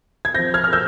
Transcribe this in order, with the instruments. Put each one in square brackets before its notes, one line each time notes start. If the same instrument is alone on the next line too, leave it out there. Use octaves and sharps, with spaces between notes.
[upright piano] G#6
F3 C4 G6 A#6
F6 G#6
F6
E6 G6